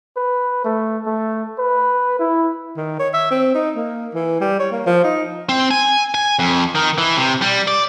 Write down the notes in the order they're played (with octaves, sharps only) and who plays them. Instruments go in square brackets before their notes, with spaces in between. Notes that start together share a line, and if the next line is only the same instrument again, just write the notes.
[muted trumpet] B4
A3
A3
B4
E4
[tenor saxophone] D#3
C#5
E5
C4
D#4
A#3
E3
G3
C#5
A#3
F3
D#4
[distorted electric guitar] C4
G#5
G#5
F2
D#3
E3
C3
G3
D5